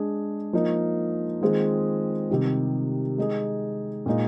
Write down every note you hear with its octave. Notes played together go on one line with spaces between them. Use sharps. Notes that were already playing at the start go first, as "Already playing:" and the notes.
Already playing: G#3 D4 G#4
F3 A#3 D#4
D#3 G#3 C4 F4 G#4
C3 D#3 G3
G#3 D#4 G#4
A#2 G#3 D#4